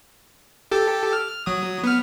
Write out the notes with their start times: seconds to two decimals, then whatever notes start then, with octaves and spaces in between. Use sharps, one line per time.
0.71 G4 A4
1.13 F6
1.46 F#3 D#6
1.84 B3 F6